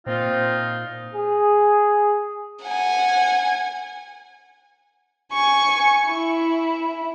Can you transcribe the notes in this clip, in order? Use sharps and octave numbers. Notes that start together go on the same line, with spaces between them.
A#2 C4 D#4 F4
G#4
F#5 G#5
G#5 C#6
E4